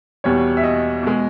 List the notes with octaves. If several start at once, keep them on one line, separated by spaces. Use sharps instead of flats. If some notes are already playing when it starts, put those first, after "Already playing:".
E2 B2 G3 C#5
E5
D#5
B2 G#3